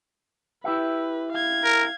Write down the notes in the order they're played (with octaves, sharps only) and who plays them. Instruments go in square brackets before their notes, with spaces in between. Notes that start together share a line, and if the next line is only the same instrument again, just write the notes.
[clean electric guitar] E4 G4 E5 [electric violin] B4
[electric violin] F5 G#6
[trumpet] A#4